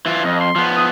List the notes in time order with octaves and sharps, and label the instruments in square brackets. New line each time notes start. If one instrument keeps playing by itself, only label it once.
[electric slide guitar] E3 F4
[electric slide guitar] F2 [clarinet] D#5
[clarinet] C6
[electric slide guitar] F3 B3
[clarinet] D#6